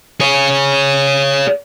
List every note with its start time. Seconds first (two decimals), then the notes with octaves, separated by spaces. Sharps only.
0.20 G#4 C#5